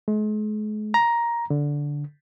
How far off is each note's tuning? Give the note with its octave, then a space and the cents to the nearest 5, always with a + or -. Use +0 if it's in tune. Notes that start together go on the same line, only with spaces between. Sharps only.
G#3 +40
A#5 +10
D3 -10